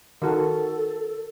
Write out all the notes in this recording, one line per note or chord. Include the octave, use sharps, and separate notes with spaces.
D#3 F#4 A4 A#4 A5